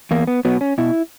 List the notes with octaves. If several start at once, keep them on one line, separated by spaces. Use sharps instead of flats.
E2 A#3
B3
B2 F#3 B3
C#4
B2 E4